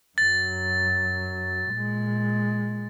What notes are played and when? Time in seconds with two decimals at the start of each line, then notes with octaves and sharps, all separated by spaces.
0.18 F#2 F#3 A6
1.70 A#2 G#3